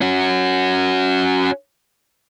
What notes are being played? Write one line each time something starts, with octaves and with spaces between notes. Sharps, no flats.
C#4 F#4